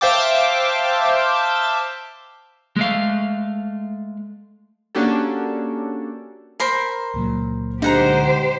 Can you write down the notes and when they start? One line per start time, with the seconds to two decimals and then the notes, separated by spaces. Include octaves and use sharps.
0.01 C5 E5 F5 G5 A5 D6
2.76 G#3 A3 F5
4.95 A#3 C#4 D4 F#4 G4 A4
6.60 A#4 C5 B5
7.14 C#2 A#2 F#3
7.82 D3 G#3 D#4 G4 C5 F#5 A#5